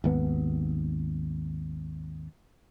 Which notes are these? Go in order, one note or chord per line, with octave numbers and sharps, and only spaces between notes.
G#1 D#2 B3